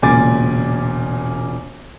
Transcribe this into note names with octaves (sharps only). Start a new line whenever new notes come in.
E1 A#2 C#3 G#5 D6 A6